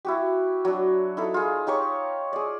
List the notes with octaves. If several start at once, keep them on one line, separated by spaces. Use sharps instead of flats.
E4 F#4 G4
F#3 D4
D#4 E4 A4
F4 G#4
D#4 G4 C#5 C#6
G#4 D5